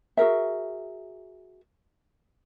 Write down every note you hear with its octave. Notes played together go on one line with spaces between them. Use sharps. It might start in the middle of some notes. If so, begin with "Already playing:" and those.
F#4 G#4 A#4 E5